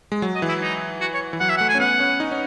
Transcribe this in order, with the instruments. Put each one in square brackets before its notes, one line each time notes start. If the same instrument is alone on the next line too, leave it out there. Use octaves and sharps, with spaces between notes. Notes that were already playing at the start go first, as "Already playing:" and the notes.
[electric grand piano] G#3
F#3
[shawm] D#5
[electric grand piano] E3
[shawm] E4
D#4
F#4
C#5
[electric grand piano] E3
[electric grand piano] F#3 [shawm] F#5
[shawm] E5
F#5
[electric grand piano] A3
[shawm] G#5
[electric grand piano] C#4
[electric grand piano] B3 [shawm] F#5
[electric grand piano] C#4
D#4
C#4